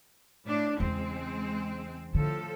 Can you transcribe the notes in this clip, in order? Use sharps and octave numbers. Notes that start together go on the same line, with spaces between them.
A2 D4
E2 C#3 G#3 C4
A2 D3 F3 A4